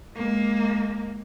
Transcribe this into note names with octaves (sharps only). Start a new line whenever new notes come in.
G#3 A#3